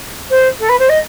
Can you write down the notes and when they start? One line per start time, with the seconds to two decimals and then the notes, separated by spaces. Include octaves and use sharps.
0.30 C5
0.59 A4
0.69 B4
0.79 C5
0.89 D#5